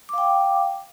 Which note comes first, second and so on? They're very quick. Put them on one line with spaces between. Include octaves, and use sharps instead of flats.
D6 F5 G5